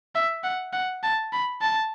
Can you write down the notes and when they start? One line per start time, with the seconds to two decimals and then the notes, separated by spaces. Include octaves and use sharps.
0.15 E5
0.43 F#5
0.73 F#5
1.03 A5
1.33 B5
1.62 A5